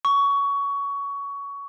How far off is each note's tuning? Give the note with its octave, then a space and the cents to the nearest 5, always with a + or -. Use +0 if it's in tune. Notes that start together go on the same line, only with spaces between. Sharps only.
C#6 +20